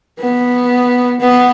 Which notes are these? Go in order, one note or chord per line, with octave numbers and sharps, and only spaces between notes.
B3
B3